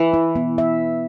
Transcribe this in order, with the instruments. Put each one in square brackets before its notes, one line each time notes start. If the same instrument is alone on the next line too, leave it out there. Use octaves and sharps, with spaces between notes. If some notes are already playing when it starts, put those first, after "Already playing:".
Already playing: [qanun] E3
[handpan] E4
B3
E5